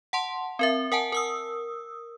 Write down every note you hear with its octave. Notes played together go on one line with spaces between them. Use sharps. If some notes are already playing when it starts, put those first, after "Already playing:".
F#5 A5 C6
C4 A#4 E5
A#4 F#5 G#5 A5
A#4 D#6 E6